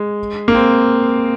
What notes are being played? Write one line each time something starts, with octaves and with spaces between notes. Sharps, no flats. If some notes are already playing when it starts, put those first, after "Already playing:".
Already playing: G#3
A#3
C4